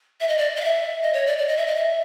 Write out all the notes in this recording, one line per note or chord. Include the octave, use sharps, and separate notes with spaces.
E5
D#5
D5
D#5
F5
E5
D#5
C#5
D5
D5
D#5
E5
D#5
E5